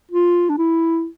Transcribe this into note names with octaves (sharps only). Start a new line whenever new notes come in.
F4
D4
E4